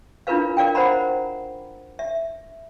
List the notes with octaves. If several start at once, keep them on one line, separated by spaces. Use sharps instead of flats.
D4 E4 F4 A#4 B4 F5
A#4 D5 F5 G5
A#4 C5 F#5 A#5 B5
E5